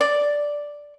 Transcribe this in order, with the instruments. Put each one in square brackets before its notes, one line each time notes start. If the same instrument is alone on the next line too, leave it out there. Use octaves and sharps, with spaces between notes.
[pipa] D5